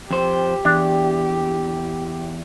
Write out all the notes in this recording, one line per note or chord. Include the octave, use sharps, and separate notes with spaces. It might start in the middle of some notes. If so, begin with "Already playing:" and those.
F2 G4 C5
E2 D4